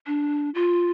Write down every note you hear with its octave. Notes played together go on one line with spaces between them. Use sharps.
D4
F4